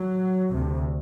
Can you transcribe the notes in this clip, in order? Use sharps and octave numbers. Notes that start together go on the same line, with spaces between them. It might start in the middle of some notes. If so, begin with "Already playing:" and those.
Already playing: F#3
D2 C3